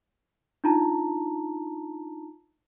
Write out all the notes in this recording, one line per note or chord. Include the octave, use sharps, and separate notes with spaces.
D4 D#4 F4 A5 A#5